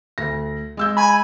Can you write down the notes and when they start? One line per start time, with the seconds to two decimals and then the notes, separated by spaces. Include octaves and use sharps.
0.18 D2 A#6
0.77 G#3 E6 G6
0.97 G#5 B5